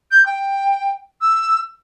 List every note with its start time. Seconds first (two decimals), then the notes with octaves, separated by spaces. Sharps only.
0.11 G6
0.26 G5
1.21 E6